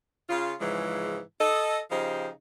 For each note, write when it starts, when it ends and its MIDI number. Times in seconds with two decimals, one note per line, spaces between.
0.29 0.54 49
0.29 0.54 65
0.60 1.19 44
0.60 1.19 49
0.60 1.19 52
0.60 1.19 53
0.60 1.19 56
1.40 1.79 69
1.40 1.79 75
1.91 2.29 49
1.91 2.29 53
1.91 2.29 63
1.91 2.29 67
1.91 2.29 72